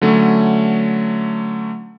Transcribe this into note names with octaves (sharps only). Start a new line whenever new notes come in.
D3 F#3 A3 C#4